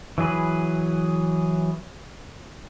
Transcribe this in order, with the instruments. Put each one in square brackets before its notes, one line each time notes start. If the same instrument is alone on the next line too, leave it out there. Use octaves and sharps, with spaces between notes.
[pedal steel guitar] E3 F#3 G#4 B4